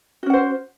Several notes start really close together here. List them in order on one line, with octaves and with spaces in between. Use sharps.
F#4 C#4 F#5 C5